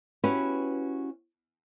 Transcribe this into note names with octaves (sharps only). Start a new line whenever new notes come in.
C#4 E4 F#4 G4 B4